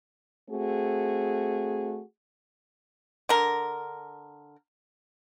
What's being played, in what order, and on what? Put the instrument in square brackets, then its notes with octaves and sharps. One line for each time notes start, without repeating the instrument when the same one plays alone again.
[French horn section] A3 C4 F#4 G#4
[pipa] D3 A#4